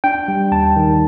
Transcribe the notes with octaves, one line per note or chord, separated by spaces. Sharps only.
D4 G5
G3
D#2 A5
D#3